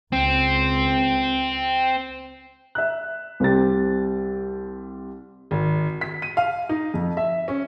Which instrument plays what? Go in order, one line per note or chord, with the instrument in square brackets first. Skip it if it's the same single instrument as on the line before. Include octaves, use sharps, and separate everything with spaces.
[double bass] C#2 [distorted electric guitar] C4
[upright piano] E5 F#6
C2 C4 G4 A6
G#1
B6
D#7
F5
D#4
F2
E5
C#4